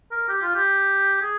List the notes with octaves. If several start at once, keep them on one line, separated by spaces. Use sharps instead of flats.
A#4
G4
F4
G4
G#4